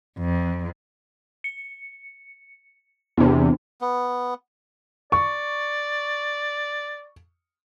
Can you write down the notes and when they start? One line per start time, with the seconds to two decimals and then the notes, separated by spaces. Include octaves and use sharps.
0.19 F2
1.44 C#7
3.17 E2 C3 B3 D4
3.81 B3
5.12 D5 C#6